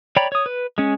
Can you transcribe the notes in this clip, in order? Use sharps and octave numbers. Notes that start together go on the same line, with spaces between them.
C#5 D5 G5 A#5 B5
C#5 D#6
B4
G#3 C#4